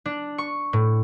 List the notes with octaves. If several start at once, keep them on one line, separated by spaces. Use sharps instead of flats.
D4
C#6
A2